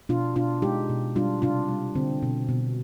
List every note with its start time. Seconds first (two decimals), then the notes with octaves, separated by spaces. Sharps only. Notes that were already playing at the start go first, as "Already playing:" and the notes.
0.09 B2 D4 F4
0.36 B2 D4 F4
0.62 G#3 D#4 G4
0.89 B2
1.16 G3 D4 F4
1.42 C3 D4 F4
1.69 G3
1.95 D3 C4
2.23 B2
2.49 B2